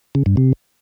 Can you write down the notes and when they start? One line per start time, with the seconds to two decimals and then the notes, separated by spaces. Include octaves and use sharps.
0.15 C#3
0.26 G2
0.37 C3